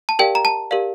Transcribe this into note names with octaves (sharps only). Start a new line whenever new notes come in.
A5
G4 A#4 D5 F5 G5
A#5
A5
G4 A#4 D5 F5